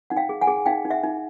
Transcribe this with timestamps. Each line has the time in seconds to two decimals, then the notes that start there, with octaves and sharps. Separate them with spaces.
0.10 D#4 F#5
0.17 F5 G5
0.29 G#4
0.42 F#5 G#5
0.47 G#4
0.66 D#4 F5 G5
0.85 D#4
0.90 E5 F#5
1.03 D#4